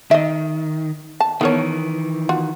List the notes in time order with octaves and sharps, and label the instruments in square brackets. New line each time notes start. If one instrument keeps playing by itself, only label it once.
[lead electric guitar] D#3 [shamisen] D#5 E5
[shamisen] A5
[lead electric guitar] D#3 E3 [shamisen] B3 A#4 C#5
[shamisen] F4 F#4